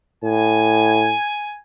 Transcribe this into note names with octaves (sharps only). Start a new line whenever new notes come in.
A2 G#5